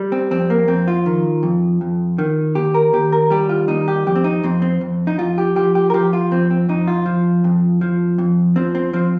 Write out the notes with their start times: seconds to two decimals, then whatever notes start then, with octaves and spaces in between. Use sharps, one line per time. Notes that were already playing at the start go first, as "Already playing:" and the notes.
Already playing: G3
0.12 C4
0.31 F2 C4
0.50 A#3
0.68 F2 C4
0.88 F4
1.06 D#3
1.43 F2
1.81 F2
2.18 D#3
2.55 D#2 G4
2.74 A#4
2.93 D#2 G4
3.12 A#4
3.30 G3 G4
3.49 F4
3.68 D#2 D#4
3.88 G4
4.07 F2 G4
4.16 C4
4.24 D#4
4.43 F2 C4
4.62 C4
4.81 F2
5.07 D#4
5.19 F2 F4
5.38 G4
5.56 F3 G4
5.75 G4
5.90 A#4
5.94 F3 G4
6.13 F4
6.31 F2 C4
6.51 C4
6.69 F2 D#4
6.88 F4
7.06 F3
7.44 F2
7.81 F3
8.18 F2
8.56 F3 C4
8.75 C4
8.93 F3 C4